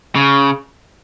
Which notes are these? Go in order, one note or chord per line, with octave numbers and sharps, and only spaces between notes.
C#3